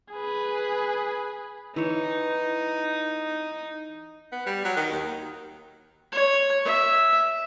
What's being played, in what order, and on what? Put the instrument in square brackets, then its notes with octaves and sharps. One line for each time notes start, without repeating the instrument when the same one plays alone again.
[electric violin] G#4 B4
[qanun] E3 C#5 [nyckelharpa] D#4
[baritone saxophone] B3
G3
F#3
D#3
D#2
[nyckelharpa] C#5
E5